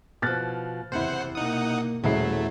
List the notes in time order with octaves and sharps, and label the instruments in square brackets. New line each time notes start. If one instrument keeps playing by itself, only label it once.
[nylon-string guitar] B2 F3 [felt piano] F6 F#6 A6
[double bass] F#1 E2 [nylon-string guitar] C3 E4 [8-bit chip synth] C5 F#5
[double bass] B2 A#3 [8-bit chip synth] D#4 F#5 D#6
[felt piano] D#1 G#4 C7 [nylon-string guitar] F#3 E4 [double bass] G#3 [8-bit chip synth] A3